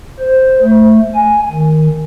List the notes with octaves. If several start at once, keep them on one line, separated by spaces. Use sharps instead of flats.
C5
A3
G#5
D#3